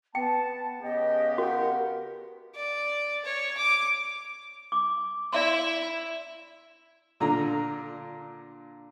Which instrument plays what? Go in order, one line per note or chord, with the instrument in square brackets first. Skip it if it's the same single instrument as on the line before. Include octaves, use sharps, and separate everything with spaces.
[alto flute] B3 [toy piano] G5 [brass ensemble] A5
[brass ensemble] C#3 B3 G4 [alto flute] D#5
[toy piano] F#4 [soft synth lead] A#4 [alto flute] F#5
[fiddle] D5
C#5
D6
[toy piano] D6
[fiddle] E4 [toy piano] D5 E5 C6
[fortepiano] A#2 D3 A#5